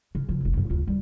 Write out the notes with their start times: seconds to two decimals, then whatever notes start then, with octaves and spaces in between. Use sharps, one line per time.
0.15 C#3
0.29 F3
0.41 F1 C2
0.53 F#2 B2
0.70 D2 F4
0.87 G3